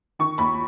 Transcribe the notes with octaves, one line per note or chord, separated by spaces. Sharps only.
D#3 C#6
D#2 B5